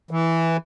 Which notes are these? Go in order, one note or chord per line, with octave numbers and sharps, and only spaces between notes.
E3